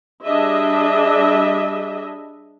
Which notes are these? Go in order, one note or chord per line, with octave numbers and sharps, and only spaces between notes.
G3 D4 G#4 D#5 E5